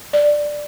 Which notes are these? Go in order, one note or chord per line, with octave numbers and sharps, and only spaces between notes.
D5